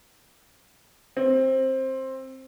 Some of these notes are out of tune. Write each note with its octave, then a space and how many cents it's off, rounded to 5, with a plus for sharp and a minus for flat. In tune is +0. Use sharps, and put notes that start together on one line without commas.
C4 +15